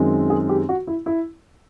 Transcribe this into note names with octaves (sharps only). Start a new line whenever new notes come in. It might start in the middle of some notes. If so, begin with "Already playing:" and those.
Already playing: F#2 D#3 G#3 C4
G#4
G4
F#4
E4
E4